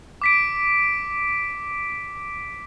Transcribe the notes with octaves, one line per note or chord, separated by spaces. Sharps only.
D6 B6 D7